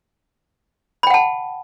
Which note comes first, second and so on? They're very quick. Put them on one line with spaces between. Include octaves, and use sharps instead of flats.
B5 G5 F#5 A5